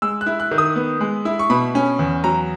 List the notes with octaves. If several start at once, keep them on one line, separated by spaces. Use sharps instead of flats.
G#3 E6
F#6
E4
F#6
D#3
D#6
B3
G#3
E4
C#6
B2 B5
C#4
E2
F#3 A#5